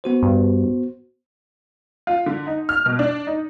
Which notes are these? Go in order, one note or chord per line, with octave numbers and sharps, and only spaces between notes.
B3 F#4 C5
G2
F4
D3
D#4
F6
B2
D4
D#4